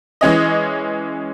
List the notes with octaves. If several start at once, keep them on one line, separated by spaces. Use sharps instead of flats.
E3 G#3 C#4 D#5